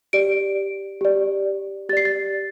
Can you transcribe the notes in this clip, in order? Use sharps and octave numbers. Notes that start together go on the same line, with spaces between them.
G4 D5 D7
G4 D5
G4 D5 A6 C7
A6